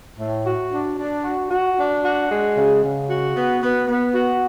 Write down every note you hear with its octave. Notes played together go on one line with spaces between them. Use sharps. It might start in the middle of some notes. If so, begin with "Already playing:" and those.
A2
F#4
D4
D4
F#4
F#4
D4
F#4
G#3
C#3
C#3
F#4
B3
B3
B3
F#4